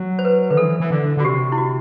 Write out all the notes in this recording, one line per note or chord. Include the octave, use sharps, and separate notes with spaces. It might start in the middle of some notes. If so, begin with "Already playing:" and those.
Already playing: F#3
C5
B4
D3 B4
E3 A4
E3
D3
D3
F#4
C3 G4
E4
F#4